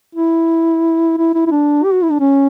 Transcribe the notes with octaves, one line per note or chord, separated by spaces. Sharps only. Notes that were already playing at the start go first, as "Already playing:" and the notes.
E4
E4
E4
E4
D4
G4
F#4
E4
D4
C#4